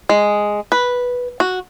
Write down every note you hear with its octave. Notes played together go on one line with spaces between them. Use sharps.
G#3
B4
F#4